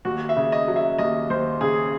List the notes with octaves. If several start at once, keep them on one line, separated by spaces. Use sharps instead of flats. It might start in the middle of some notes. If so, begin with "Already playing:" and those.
D#2 F#4
E5
C#3
D#5
F#3
E5
D#2 D#5
D#2 C5
C#3 G#4